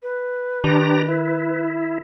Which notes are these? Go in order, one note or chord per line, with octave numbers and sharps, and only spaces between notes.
B4
D#3 D4 G4 A#5
E4